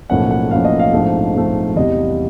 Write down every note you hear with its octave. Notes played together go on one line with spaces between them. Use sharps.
B1 A2 F3 A#3 C#4 F#5
F#5
B1 A2 F3 A#3 C#4 F5
D#5
F5
A#1 G#2 F3 A3 C4
A#1 G#2 F3 A3 C4
E2 C3 E3 G3 D#5